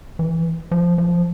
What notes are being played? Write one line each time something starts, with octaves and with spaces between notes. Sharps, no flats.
E3
F3
F3